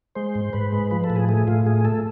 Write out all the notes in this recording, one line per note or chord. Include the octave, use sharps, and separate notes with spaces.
G#3 C5
G#2
G#2 B4
G#3
F3 B4
A4
A2
G#4
A3 G#4
A2 F4
A3 G#4
A3 A4